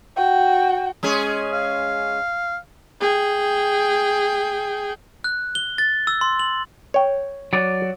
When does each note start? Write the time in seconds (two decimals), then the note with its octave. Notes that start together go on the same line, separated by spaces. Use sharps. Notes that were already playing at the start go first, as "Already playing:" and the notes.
0.16 F#4 G5
1.03 G#3 C#4 G#4
1.53 F5
3.01 G#4 G5
5.24 F#6
5.55 G7
5.78 A6
6.07 E6
6.21 C6
6.39 F#7
6.94 C#5 G5
7.53 F#3 D5